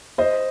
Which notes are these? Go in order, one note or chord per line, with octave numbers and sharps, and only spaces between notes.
C5 D#5